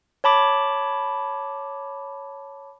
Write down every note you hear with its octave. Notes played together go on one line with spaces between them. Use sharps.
C#5 A5 B5 D6